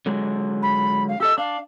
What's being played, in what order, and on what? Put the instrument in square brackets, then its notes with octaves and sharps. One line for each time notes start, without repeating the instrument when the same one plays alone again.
[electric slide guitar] D3 F#3 G#3
[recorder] B5
F5
[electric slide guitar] G4 A4 D#5 [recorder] E6
[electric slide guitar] D4 [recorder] F5